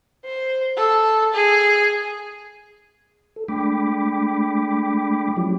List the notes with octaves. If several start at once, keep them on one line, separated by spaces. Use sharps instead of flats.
C5
A4
G#4
A4
G#3 A3 D4 G5 B5 D6
F3 F#3 G#3 C#4 E4 G4